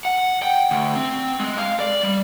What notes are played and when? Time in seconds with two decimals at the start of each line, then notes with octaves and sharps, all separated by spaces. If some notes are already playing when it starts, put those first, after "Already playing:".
0.05 F#5
0.42 G5
0.71 D2
0.96 C4
1.40 G#3
1.58 F5
1.80 D5
2.03 G3